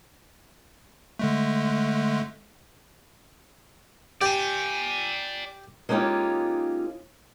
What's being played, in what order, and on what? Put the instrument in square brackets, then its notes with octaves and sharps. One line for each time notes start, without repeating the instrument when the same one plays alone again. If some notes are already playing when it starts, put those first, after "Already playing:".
[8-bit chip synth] D3 G#3 A3
[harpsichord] G4 [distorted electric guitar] D5 G#5
[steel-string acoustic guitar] G#3 A#3 C#4 D#4 F4 G4